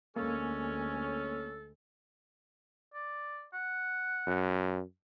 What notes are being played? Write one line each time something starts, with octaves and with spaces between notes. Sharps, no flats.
D2 G#3 A#3 C#4 A4
D5
F#5
F#2